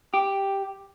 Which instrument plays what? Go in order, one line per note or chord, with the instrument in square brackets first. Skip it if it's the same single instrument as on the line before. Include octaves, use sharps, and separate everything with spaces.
[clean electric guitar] G4